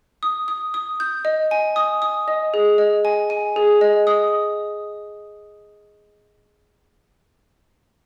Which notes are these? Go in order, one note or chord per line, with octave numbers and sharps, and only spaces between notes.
D#6
D#6
D#6
G6
D#5
G#5
D#6
D#6
D#5
G#4
D#5
G#5
G#5
G#4
D#5
D#6